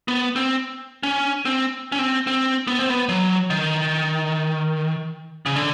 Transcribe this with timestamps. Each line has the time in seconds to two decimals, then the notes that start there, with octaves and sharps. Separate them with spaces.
0.08 B3
0.36 C4
1.03 C#4
1.45 C4
1.92 C#4
1.99 C4
2.27 C4
2.67 B3
2.79 C4
2.90 B3
3.09 F#3
3.50 D#3
5.46 C#3
5.56 D3